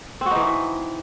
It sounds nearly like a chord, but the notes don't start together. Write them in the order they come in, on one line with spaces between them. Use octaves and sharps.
C4 F#4 D#4 E3